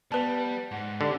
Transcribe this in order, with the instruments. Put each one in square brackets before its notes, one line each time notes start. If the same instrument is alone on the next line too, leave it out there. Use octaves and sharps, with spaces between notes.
[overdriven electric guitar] G3 [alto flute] B3 [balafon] B4 A5
[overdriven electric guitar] G#2 [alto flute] F#5
[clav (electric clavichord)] D3 [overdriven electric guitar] C#4 D4 [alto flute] G4